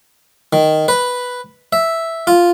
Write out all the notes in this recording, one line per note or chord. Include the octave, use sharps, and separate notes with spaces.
D#3
B4
E5
F4